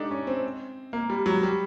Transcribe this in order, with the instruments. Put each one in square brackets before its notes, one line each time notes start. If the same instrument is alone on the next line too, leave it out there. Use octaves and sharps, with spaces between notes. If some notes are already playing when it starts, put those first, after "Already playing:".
Already playing: [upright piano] D4 D#4 G4 A4
C#4
C4
A#3
G3
F#3
G3